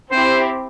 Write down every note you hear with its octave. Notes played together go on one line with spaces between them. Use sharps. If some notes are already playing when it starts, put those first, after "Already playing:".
C4 E4 G4 C5